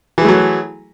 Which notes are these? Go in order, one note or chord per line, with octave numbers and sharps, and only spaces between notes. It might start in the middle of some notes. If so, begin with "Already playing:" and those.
E3 F#3 A3 G#4